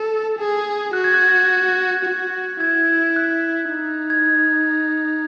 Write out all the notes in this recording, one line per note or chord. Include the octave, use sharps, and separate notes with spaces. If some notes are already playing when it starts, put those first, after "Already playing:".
Already playing: A4
G#4
F#4 F#6
G#6
F#6
F#4
E4 G#6
F#6
D#4
G#6